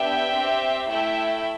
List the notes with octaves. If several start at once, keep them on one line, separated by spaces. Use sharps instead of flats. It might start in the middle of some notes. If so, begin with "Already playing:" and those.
Already playing: B3 D4 G4 E5 G5
C4 G4
A3 E4 A4 E5 G5